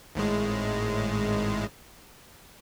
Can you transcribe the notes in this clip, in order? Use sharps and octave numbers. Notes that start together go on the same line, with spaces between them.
G#1 A2 G#3